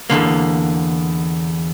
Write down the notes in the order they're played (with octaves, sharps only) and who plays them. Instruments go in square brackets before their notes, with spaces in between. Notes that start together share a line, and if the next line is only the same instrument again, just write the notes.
[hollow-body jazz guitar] E2 G2 D3 A#3